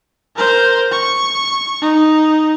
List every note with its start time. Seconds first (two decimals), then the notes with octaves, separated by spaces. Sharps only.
0.36 A#4 C5
0.92 C#6
1.82 D#4